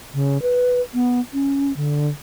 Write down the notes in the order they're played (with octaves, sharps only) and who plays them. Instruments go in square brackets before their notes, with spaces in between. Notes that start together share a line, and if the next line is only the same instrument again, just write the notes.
[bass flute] C#3
B4
B3
C#4
D3